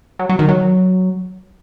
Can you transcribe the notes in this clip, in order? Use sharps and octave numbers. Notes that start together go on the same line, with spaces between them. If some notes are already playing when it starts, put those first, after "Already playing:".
F#3
F#3
D#3
F#3